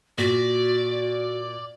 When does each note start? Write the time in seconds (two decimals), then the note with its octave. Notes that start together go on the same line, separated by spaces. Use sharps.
0.18 A#2 F#4 D5 A#6 B6